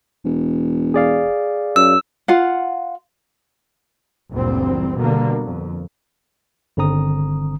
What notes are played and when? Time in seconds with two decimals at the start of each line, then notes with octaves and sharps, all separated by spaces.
0.25 E1
0.94 G#4 D5 F5
1.76 F#2 E6
2.28 F4 F5 F#5
4.33 F#1 D2 A#2 E3 G3 C4
4.97 B2 D3 G3 A#3
5.44 F2
6.77 G1 D3 D#3 C4 A#5 D#6